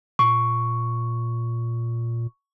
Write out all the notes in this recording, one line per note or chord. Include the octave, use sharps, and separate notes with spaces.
A#2 C#6